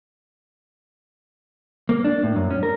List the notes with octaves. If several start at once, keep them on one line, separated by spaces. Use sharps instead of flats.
A#3
D4
A2
F#2
C#4
A#4